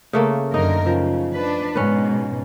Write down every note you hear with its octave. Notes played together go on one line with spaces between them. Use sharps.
C#3 A3 A#3
F#2 D3 D#4 A#4
C#3 F3
D4 B4
G#2 B2 C#4 B4